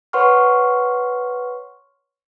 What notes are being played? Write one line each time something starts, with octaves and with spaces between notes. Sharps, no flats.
B4 C#5 F#5 C6 C#6 F6